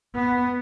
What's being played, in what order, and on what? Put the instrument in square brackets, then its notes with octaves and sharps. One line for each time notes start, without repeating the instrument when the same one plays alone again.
[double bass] B3